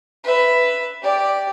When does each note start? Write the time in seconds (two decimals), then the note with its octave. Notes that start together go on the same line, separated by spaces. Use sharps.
0.24 B4 E5
1.02 G4 D5